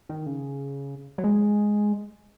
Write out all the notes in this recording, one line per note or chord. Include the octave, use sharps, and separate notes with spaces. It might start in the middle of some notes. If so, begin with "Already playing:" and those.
D#3
C#3
F#3
G#3